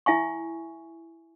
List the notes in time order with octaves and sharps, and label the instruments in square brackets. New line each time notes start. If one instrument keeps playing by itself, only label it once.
[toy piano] E4 E5 G#5 C#6